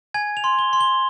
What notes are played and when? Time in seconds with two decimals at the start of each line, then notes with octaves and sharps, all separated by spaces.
0.14 G#5 G#6
0.37 F7
0.44 C6
0.59 G7
0.73 C6
0.80 G7